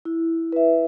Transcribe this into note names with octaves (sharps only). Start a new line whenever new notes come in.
E4
B4 E5